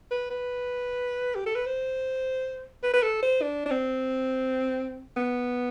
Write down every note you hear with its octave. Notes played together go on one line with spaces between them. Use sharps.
B4
B4
G4
A4
B4
C5
B4
B4
A4
C5
D4
D4
C4
B3